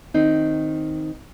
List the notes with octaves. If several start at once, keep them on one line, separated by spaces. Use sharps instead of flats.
D#3 C4 D#4